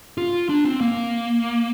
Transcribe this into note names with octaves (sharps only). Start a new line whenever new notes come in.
F4
D4
C4
A#3